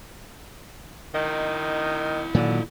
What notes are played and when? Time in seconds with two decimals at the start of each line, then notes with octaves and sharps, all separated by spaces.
1.15 D#3 E4 D#5
2.35 A#2 D3 D#3 F#3